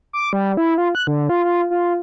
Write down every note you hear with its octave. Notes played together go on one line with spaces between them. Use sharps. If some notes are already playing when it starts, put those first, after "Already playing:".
D6
G3
E4
F4
F#6
D3
F4
F4
F4